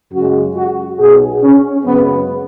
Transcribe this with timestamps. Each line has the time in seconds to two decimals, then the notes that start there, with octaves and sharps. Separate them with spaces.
0.12 F#2 C#3 G#3 F#4
0.55 F#4
0.98 B1 B2 F#3 G#4
1.42 C#4
1.85 F#2 C#3 G#3 B3